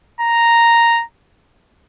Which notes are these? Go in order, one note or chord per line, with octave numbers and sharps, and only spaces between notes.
A#5